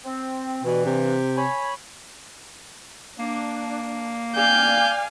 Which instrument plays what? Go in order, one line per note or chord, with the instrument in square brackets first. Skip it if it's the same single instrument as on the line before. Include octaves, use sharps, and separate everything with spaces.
[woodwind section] C4
[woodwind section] G2 E3 [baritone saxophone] B2
[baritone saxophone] C3
[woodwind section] C#5 G#5 B5
[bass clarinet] A#3 [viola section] D4
[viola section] D5 F5 G5 [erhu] G#5 [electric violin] G6